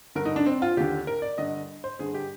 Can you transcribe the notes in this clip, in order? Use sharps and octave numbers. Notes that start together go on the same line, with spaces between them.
G2 D3 A#4
D#4
D4
C4
F4
D#2 D3 G4
A#4
D5
G2 D3 D#5
C5
G2 D3 G#4
G4